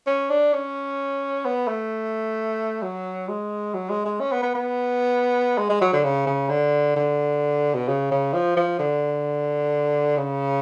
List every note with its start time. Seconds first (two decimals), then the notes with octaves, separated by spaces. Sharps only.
0.07 C#4
0.30 D4
0.53 C#4
1.45 B3
1.68 A3
2.83 F#3
3.28 G#3
3.74 F#3
3.89 G#3
4.06 G#3
4.20 C#4
4.32 B3
4.43 B3
4.55 B3
5.58 G#3
5.70 G#3
5.81 F#3
5.93 D3
6.04 C#3
6.27 C#3
6.49 D3
6.96 D3
7.74 B2
7.88 C#3
8.11 C#3
8.33 F3
8.57 F3
8.79 D3
10.17 C#3